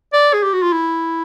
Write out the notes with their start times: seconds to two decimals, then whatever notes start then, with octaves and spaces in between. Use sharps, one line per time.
0.13 D5
0.34 G#4
0.43 G4
0.53 F#4
0.63 F4
0.73 E4